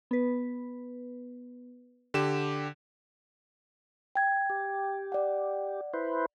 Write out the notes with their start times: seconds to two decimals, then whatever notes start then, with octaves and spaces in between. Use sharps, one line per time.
0.11 B3 B4
2.14 D3 G4 E7
4.15 G5 G#6
4.50 G4
5.12 D5 F#5
5.94 E4 B4 C5